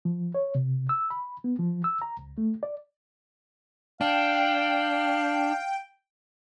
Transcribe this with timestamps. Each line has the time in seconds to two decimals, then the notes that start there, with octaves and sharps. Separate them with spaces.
0.05 F3
0.35 C#5
0.55 C3
0.89 E6
1.10 B5
1.44 B3
1.59 F3
1.84 E6
2.02 A#5
2.19 C#2
2.38 A3
2.63 D5
4.01 D4 F5 G5